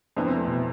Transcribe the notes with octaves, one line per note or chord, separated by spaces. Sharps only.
F2 C3 E3 B3 D4
C4
A3
B2